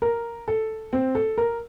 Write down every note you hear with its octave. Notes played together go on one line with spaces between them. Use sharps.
A#4
A4
C4
A4
A#4